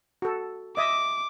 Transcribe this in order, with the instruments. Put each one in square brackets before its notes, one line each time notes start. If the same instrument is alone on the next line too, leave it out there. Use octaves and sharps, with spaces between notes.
[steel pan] F#4 A4
[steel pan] D#5 E5 D#6 [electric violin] D6